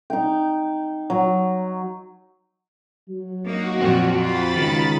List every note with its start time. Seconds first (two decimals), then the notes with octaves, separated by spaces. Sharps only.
0.10 D#4 G5
1.10 F#3
3.09 F#3
3.45 A#3 D#4 F#4
3.81 F2 A#2 C4
4.19 F4 B5 A6
4.55 C#2 D#3